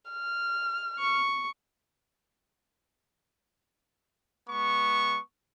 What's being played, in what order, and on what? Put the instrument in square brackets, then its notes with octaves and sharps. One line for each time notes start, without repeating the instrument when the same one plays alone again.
[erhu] F6
[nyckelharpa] C#6
[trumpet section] G#3 B3 C#6